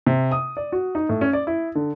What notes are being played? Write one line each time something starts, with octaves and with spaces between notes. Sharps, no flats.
C3
D#6
D5
F#4
D#4
A2
C#4
D5
E4
D3